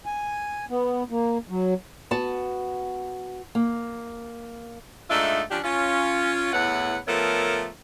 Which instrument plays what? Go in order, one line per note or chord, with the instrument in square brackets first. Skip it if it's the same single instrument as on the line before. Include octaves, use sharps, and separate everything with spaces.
[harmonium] G#5
B3
A#3
F#3
[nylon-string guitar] B3 F#4 A5
A#3
[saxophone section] G#2 A3 D4 D#4 F4 E5
F3 C#4 D4 G4
C#4 F4
E2 A2 B3 B4 C#5 F#5
F3 A3 B3 A4 A#4 C#5